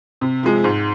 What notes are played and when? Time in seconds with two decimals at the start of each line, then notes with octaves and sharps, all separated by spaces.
0.21 C3
0.43 F3 G#3
0.64 G#2